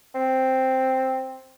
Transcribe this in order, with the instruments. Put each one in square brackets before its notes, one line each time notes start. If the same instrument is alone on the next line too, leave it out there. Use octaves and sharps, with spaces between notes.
[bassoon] C4